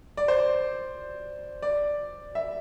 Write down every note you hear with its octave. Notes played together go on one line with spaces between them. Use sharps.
D5
C5
D5
D5
E5